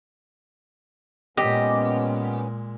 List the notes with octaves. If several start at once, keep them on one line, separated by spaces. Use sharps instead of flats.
A#2 G#3 B3 C#4 G4 D#5